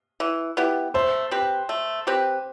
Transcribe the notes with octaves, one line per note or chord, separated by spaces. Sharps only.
E3
B3 E4 G4
A3 C5
C4 G4 B4
A3
C4 G4 B4